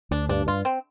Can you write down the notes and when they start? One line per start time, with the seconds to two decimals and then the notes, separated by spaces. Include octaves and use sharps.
0.11 D2 D4
0.29 G2 D4
0.47 G2 F4
0.65 C4